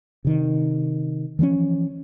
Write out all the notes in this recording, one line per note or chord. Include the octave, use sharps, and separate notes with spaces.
C3 D#3
E3 F3 G#3 C#4